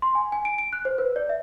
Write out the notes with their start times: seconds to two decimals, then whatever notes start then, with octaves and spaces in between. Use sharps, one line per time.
0.02 C6
0.15 G#5
0.32 G#5
0.45 D7
0.58 D7
0.73 F#6
0.85 C5
0.98 B4
1.16 D5
1.29 E5